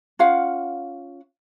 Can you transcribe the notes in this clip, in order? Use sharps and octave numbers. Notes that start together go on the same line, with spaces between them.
C#4 F4 F5 F#5